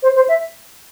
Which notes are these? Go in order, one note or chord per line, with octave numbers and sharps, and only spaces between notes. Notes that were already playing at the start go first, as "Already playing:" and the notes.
C5
C5
E5